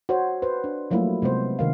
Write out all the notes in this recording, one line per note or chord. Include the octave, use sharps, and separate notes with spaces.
F#4 C5 C#5
B4 C5
D4
F3 F#3 A3 A#3 E4
C3 G#3 B3 C5
C3 D#3 F5